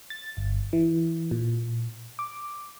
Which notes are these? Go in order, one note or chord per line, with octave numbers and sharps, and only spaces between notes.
A6
G1
E3
A#2
D6